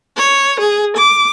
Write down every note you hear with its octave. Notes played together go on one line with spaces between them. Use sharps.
C#5
G#4
D6